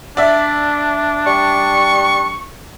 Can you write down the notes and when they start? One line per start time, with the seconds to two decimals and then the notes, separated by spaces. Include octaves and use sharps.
0.17 D4 D5 E5
1.27 G3 C#6